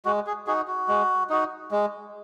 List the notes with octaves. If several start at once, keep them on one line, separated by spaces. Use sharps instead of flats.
G#3 F#4
G#4
D#4 F#4 G#4
F#4
G#3
D#4 F#4
G#3